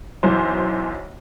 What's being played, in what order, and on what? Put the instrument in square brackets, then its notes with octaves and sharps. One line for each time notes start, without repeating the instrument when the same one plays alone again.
[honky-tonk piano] B1 F#2 E3 C5